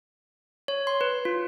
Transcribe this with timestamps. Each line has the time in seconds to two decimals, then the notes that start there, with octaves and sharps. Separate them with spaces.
0.68 C#5
0.87 C6
1.01 B4
1.25 F4